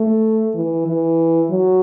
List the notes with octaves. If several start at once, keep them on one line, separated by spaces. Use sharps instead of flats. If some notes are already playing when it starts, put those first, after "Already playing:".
Already playing: A3
E3
E3
F#3